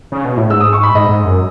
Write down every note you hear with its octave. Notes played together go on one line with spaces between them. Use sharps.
C#3
B2
A2
G#2 E6
D#6
C#6
B5
G#2 D#5
G#2
F#2